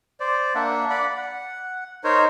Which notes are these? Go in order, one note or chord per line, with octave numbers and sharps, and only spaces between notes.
C5 D5
A#3 D4 E5 F#5
D5 F#5 B5
F#5
D#4 A#4 C5 C#5